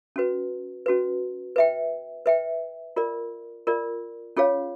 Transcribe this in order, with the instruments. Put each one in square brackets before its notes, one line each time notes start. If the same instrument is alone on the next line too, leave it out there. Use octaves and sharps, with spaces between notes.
[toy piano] C#4 F#4 B4
C#4 F#4 B4
B4 E5 G5
B4 E5 G5
F4 A#4 D5
F4 A#4 D5
C#4 F4 G#4 C#5 F5